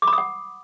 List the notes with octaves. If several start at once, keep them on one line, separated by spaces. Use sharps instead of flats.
D6
B5
D#6
F#5